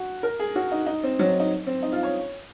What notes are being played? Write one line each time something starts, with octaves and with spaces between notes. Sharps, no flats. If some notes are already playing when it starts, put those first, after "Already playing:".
Already playing: F#4
A#4
G#4
F#4
D#4
D#4
C4
F#3
D#4
C4
D#4
F4
C#5